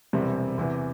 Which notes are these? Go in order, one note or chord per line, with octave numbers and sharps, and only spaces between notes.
E1 E2 C3 G3 C4
E2 C3 E3